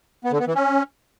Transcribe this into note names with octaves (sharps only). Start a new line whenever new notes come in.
B3
D3
B3
E3
C#4